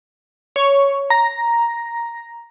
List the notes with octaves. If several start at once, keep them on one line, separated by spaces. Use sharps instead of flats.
C#5
A#5